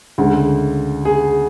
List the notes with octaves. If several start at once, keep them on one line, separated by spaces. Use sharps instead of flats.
D2 C#3 G#3
G#4